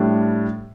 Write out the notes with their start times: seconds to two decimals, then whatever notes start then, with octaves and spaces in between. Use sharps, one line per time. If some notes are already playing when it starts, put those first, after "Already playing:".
Already playing: A2 G3 D4